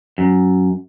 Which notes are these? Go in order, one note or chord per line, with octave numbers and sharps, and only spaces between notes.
F#2